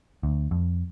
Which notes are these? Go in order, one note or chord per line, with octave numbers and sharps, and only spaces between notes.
D2
F2